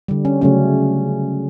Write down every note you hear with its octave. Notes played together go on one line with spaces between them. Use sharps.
D3 G3
C#4
C#3 F#3 A3 C#4